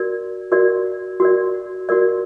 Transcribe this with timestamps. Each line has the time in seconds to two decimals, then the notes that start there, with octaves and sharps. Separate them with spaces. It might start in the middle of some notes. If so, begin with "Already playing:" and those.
Already playing: F#4 A#4 D5
0.52 F#4 A#4 D5
1.20 F#4 A#4 D5
1.89 F#4 A#4 D5